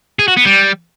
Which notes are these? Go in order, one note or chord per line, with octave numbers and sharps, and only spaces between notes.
G#4
F#4
B3
G3